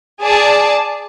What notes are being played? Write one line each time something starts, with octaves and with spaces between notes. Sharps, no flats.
G#4 D5 A5